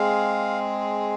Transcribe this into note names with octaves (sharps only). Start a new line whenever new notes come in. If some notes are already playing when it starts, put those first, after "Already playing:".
Already playing: G#3 C4 G#4 F5